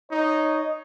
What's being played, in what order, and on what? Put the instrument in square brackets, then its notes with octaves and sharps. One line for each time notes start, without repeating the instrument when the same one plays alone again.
[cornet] D#4 [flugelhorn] C#5 [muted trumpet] D#5